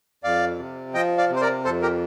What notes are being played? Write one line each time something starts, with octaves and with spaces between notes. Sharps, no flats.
F2 D5 F5
C3
F3 D#5 G5
D5 F5
C3
C5
A#4 D5
F2 A4 C5
G4 A#4